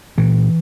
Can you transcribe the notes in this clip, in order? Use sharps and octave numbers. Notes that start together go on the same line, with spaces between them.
A#2 E3